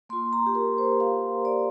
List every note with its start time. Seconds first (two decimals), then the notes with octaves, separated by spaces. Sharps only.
0.09 A#3 F4 C6
0.33 A#5
0.46 G4
0.55 A#4
0.78 C5
1.00 F5
1.45 D5